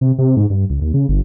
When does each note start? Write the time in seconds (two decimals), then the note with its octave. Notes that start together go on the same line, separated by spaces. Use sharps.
0.01 C3
0.18 C3
0.37 G#2
0.50 G2
0.70 C#2
0.82 D#2
0.94 C#3
1.09 G1